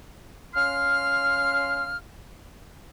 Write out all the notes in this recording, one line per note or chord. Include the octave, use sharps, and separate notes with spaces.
C#4 F5 C6 F6